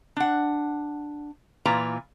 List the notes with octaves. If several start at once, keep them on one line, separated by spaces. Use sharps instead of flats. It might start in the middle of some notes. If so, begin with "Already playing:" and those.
D4 F#5
A#2 E3 F4 B4 A#5